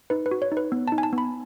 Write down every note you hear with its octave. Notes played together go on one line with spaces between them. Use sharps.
D#4 B4
B4
F#4
C#5
D#4
B4
B3
A5
D#4
G#5
A5
B3
B5